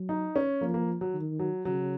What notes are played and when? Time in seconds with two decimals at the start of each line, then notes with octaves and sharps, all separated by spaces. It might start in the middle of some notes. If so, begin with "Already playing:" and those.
Already playing: F#3
0.09 D#4
0.36 C#4
0.61 F3 A#3
0.74 A#3
1.01 F#3
1.14 D#3
1.39 F#3
1.65 C#3 F#3